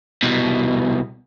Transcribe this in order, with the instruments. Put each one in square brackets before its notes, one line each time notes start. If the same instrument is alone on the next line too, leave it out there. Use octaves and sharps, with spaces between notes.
[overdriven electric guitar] C2 B2